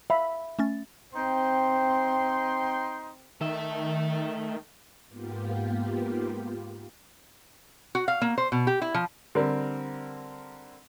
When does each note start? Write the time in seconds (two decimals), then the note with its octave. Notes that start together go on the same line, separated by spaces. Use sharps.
0.10 E5 F5 B5
0.59 A3 C#4 A6
1.15 C4 D#4 G5 C6
3.41 D#3 A3 E5
5.07 G#2 A#3 B3 F4 G4
7.95 F#4
8.08 F5
8.22 A#3
8.38 C5
8.52 B2
8.67 G4
8.82 E4
8.94 F3
9.35 D3 G3 C4 A#4